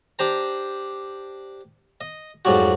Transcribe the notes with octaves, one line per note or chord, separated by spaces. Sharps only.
D4 G4 C5 A#5
D#5
F2 G#2 F#3 G3 F#4